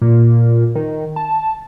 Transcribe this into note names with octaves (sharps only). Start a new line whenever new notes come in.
A#2
D#3
A5